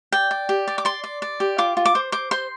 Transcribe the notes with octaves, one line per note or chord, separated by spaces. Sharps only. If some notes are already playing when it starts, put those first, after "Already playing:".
D5 G5
D5
G4
D5
D6
D5 C6
D5
D5
G4
F4 D6
F4
D6
C5
C5 D6
C5 C6